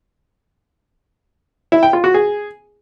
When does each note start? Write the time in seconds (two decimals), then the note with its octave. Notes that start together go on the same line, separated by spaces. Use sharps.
1.72 E4
1.83 G5
1.93 F4
2.04 F#4
2.14 G#4